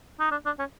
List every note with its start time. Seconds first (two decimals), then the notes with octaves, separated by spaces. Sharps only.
0.20 D#4
0.31 D4
0.46 D4
0.59 C#4